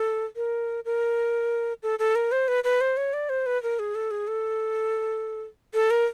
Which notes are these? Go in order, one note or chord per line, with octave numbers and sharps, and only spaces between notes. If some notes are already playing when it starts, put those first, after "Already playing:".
Already playing: A4
A#4
A#4
A4
A4
A#4
C5
B4
B4
C5
C#5
D5
C5
B4
A#4
G#4
A4
G#4
A4
A4
A#4